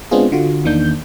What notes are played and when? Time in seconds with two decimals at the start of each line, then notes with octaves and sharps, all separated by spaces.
0.11 G#3 B3 C4 D4 F4 G#4
0.32 D3 F4 F#4
0.65 E2 D#3 A#3 D4 G6